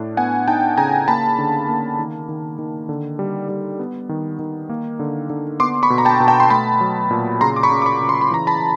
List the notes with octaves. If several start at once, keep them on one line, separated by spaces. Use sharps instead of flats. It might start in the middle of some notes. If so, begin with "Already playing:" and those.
Already playing: A2 D4
B3 F#5 G#5
D#4 G5 A5
C#3 G#5 A#5
A#3 A5 B5
D3
A#3
D#3
D#3
D#3
D3
G3
G3
B3
D#3
D#3
A#3
D3
D3
B3 C6 D6
B5 C#6
B2
A#5
G5 A5
B2
G5 A5
C6
A3 A5 B5
F#3
A#2
C#3 A#5 C6
D6
B5 C#6
C#3
D6
B5 C#6
C#3
C6
B5
E3 A#5
A5 B5